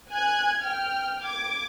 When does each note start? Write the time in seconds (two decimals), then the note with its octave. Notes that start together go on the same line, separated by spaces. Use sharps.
0.10 G#5 F#6 G#6
0.62 G5 F6
1.22 D6 G#6